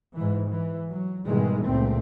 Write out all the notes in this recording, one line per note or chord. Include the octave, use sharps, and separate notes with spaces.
G#2 E3
E3
F#3
G#2 B2 D#3 E3 G3 G#3
C#2 A#2 A3 C4